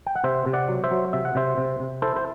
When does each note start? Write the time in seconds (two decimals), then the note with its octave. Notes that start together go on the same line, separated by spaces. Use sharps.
0.06 G5
0.15 F#5
0.24 C3 C5 E5
0.46 C3
0.53 D5 F#5
0.68 F#3
0.84 C5 E5
0.91 F#3
1.13 C3 E5
1.25 F#5
1.35 C3 C5 E5
1.58 C3
1.80 C3
2.02 E4 A4 C5
2.16 C5